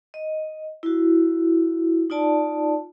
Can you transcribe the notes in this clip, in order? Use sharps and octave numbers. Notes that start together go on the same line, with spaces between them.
D#5
E4 F#4
D#4 F4 D5 A5